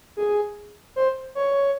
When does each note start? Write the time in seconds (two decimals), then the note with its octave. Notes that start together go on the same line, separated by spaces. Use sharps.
0.17 G#4
0.96 C5
1.35 C#5